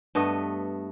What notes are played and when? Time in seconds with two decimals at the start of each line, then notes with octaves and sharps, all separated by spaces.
0.15 G2 A3 B3 D#5